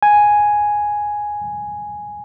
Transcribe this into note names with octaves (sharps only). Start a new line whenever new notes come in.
G#5